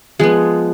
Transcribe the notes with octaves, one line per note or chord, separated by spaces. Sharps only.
F3 G#3 B3 G#4